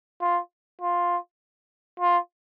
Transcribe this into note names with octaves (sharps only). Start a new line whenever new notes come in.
F4
F4
F4